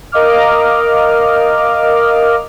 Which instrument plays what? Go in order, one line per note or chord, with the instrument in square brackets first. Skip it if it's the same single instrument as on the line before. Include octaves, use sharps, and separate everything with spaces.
[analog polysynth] A#4 D#5 F5 D6 F6